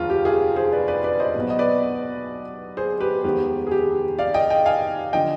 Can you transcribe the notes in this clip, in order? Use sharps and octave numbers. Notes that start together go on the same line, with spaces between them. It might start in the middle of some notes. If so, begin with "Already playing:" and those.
Already playing: F1 D#2 D3 F3 G#3 F4
G4
F4 G#4
G#4 C5
B4 D5
B4 D5
B4 D5
C5 D#5
B1 B2 B3
D#5
B4 D5
G#4 C5
G4 B4
F1 D#2 D#3 G#3 B3 G4
G#4
G4
D5 F5
D#5 G5
D#5 G5
F5 G#5
D3 F3 D#5 G5